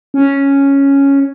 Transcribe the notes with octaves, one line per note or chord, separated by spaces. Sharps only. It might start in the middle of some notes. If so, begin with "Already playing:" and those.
C#4